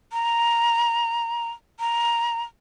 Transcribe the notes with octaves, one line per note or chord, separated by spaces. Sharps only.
A#5
A#5